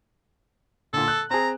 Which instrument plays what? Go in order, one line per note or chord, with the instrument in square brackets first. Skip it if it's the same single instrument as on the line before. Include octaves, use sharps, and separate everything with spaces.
[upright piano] A#2 D3 [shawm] A4
[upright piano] F#6
[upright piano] C4 G#4 [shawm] A#5